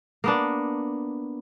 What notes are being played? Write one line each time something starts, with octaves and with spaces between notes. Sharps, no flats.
A#3 B3 D4